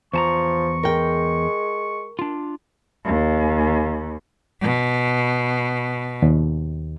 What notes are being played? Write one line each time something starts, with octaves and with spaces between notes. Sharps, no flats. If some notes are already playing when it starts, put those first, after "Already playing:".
E2 F3 A5 A#5 C#6
G#3 A#4 G5
D4 F4
D#2
B2
D#2